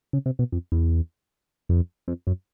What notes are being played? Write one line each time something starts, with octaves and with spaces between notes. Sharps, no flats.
C#3
C3
B2
F2
E2
F2
F2
F#2